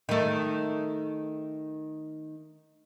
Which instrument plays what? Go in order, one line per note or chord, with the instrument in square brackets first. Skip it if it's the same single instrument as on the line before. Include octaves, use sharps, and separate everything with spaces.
[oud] D#3 A3